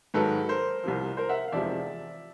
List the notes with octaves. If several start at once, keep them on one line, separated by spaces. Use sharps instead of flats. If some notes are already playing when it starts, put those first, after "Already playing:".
G#2 D#3 F#3 A4 B4
A#4 C5
C2 C3 F3
A#4 C5
E5 F#5
F5
F1 E2 C3 F3 G#3 D5 E5